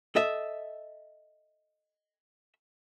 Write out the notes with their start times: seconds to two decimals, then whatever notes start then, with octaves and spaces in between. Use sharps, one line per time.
0.16 A4 D#5 E5